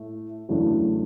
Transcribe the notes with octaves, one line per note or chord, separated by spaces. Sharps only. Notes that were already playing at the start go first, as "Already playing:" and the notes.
Already playing: A2 A3
E2 C#3 F#3 A3 D4